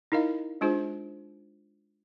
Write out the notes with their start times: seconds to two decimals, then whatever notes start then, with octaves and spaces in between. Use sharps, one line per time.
0.12 D#4 E4 A#4 D#5 F5
0.61 G#3 D4 F4 G#4 C5